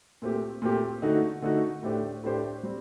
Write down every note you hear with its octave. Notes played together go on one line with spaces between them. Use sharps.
A#2 A3 C4 G4
A#2 A3 C4 G4
D3 A3 D#4 F#4
D3 A3 D#4 F#4
A2 A3 D4 G4 C5
A2 A3 D4 G4 C5
G3 C4